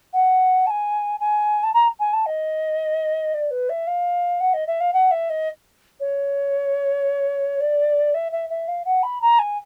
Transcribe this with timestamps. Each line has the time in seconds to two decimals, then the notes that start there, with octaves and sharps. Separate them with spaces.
0.13 F#5
0.66 A5
0.70 G#5
1.20 G#5
1.63 A5
1.74 A#5
2.00 G#5
2.13 A5
2.26 D#5
3.34 D5
3.51 B4
3.69 E5
3.87 F5
4.40 F#5
4.54 D#5
4.67 E5
4.80 F5
4.93 F#5
5.11 E5
5.30 D#5
6.00 C#5
7.60 D5
8.14 E5
8.32 E5
8.50 E5
8.68 F5
8.85 F#5
9.03 B5
9.21 A#5
9.39 G#5